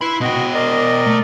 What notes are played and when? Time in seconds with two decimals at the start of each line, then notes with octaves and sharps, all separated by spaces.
0.01 E4 B4 B5 C6
0.21 B2 F#4 D#5 G5
0.54 A#4 D5 D#5
1.06 A3